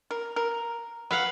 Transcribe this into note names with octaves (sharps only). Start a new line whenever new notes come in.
A#4
A#4
F#3 B4 F5 F#5